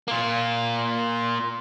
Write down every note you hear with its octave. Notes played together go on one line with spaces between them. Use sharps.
A#3 F4